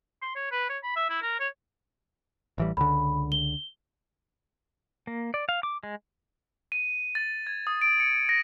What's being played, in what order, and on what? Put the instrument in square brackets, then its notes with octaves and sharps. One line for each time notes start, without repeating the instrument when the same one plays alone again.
[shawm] C6
C#5
B4
C#5
B5
E5
E4
A#4
C#5
[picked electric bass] A1 E3 G3
[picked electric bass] C#2 D3 [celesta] B5
[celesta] G7
[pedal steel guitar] A#3
D5
F5
D6
G#3
[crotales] D#7
A6
G#6
D#6
D7
C#7
A#6